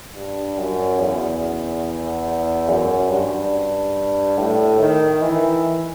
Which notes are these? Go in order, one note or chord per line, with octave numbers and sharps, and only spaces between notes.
G2
F#2
E2
F#2
G2
A2
D#3
E3